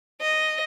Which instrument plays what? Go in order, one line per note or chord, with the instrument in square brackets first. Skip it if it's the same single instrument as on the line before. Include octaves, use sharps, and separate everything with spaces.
[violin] D#5